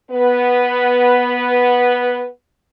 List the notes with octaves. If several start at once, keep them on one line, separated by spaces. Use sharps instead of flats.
B3 B4